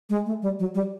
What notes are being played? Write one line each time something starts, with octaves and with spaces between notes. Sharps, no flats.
G#3
A3
G3
F#3
G3